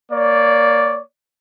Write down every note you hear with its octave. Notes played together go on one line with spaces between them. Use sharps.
A#3 C#5 D5